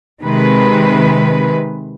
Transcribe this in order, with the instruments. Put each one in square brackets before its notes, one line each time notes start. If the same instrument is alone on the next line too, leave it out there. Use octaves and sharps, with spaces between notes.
[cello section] C3 D#3 G#3 B4